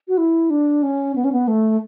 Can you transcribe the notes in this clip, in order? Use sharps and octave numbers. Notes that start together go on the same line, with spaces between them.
F#4
E4
D4
C#4
B3
C#4
B3
A3